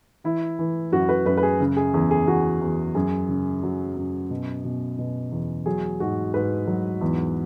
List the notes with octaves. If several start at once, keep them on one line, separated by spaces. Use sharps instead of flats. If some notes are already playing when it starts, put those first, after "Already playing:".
E3 E4
E3
F#2 F#4
B4
F#2 B4
B4
G#4
C#3
G#4
E2 G#4
G#4
E2 F#4
E2
F#2 G#4
C#3
F#3
F#2
B2
B2
B2
E2
F#3 G#4
G#2 F#4
G#2 B4
F#3
E2